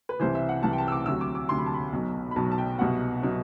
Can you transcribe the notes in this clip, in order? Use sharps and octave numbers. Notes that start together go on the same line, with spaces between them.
B4
C2 C3 E3 C5
E5
F#5
C2 C3 E3 A5
G5
A5
E6
D6
D2 C3 F#3 E6
D6
D6
D2 C3 F#3 C6
B5
A5
B5
B1 B2 F#3
B5
B1 B2 F#3 A5
A5
G5
C2 B2 F#3 F#5
B2 F#3